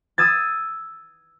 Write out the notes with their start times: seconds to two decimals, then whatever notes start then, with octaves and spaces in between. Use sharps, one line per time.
0.18 D#6 E6 G#6 A6